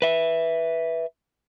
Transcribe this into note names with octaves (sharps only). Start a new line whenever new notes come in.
B4 E5